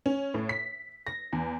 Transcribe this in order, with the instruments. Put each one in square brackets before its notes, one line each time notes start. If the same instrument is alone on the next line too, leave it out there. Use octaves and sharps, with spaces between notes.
[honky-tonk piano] C#4
A2
B6
A#6
E2